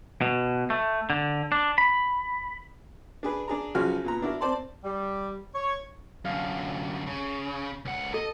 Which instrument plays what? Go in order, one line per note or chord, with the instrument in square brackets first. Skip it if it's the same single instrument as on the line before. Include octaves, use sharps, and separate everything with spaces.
[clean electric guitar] B2
A3
D3
D4
B5
[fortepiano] D4 G#4 B4
D4 G#4 A#5
B1 C#3 F3 F#4 G#5 F6
A#2 B3 A#5
D4 E4 F#4 A#4
C4 C5 D5 A5 C6
[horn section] G3
C#5
[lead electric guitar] F#2 D3 [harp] F5
[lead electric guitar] C#3
C#2 F#5
[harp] A4 [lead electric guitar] D#5